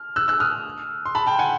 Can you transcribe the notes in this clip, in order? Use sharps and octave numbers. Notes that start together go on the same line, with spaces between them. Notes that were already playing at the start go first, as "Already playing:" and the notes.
Already playing: F6
E6 F#6
E6 F#6
D#6 F6
C6
A5 B5
G5 A5
F#5 G#5